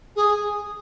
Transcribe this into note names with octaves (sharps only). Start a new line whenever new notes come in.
G#4